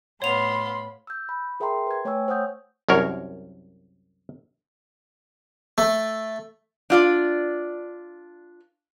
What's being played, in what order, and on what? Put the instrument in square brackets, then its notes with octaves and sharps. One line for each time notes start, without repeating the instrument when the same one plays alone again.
[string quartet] A2 B5 [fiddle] B3 F5 [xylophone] C#5 F7 [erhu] C6
[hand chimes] E6 G6
B5
G#4 A#4 E5 G5 A#5 C6
B4 G#6
A3 C#5 G5 G#5 C#6 E6
C5 C#5 F#5 D#6 G6
[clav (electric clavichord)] C2 F#2 A#4 C#5
[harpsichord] A3
[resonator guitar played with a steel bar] D4 F4 D5